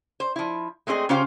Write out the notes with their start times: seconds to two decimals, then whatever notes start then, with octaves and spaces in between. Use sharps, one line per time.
0.20 C5
0.36 F3 E4
0.87 G#3 A3 C4 G#4 D#5
1.09 C#3 C#4 F4 G4 C5 F5